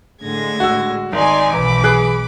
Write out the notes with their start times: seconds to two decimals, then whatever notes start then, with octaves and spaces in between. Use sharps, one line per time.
0.22 A2 D3 G#3 G#6 A#6
0.60 F#4 E6
1.13 G#1 D#4 D5 G#5 C6
1.53 B1 E3 B5 D6
1.84 G#4 F#6